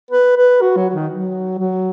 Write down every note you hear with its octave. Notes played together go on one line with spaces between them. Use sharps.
B4
B4
F#4
F#3
F#3
D#3
F#3
F#3